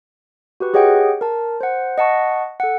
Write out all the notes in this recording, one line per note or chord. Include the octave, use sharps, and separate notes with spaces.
F#4 G4 B4 C#6
G4 G#4 C#5 D#5 F#5 G5
A#4 A5
C5 F#5
D#5 F#5 A5 C#6
A4 F#5